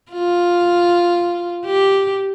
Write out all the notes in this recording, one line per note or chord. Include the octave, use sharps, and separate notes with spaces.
F4
G4